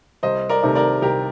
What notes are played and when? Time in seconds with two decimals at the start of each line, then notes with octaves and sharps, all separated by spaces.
0.23 C2 C5 D#5
0.49 A#4 D5
0.62 C3 D#3 A3
0.75 A#4 D5
1.02 C2 G4 A#4